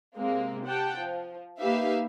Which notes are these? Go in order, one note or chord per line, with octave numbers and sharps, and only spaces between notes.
C3 G#3 A#3 C4
G4 F#5 G5 A5
F3
A#3 D#4 G4 B4 E5 F5